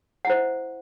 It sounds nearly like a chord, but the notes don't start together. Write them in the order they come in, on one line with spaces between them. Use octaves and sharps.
F#5 E4 C5 E5